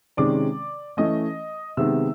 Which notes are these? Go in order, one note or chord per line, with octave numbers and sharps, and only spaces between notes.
C3 D#3 G#3 C#4 D5 D6
E3 A3 C#4 D#5 D#6
C3 D#3 G#3 B3 E5 E6